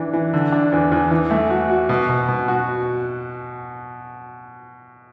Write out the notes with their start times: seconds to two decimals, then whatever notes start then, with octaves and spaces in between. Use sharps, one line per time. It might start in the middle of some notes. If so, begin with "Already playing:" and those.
Already playing: E3 D4
0.13 E3
0.33 D3
0.52 D4
0.72 E2
0.92 E2
1.11 E3
1.31 A3
1.50 F#4
1.70 F#4
1.89 B2
2.09 B2
2.28 B2
2.48 F#4